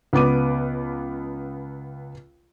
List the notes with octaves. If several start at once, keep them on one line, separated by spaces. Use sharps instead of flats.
C#2 B3 D6 D#7